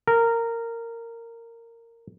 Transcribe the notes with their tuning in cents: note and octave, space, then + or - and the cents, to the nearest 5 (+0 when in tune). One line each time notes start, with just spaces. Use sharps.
A#4 -15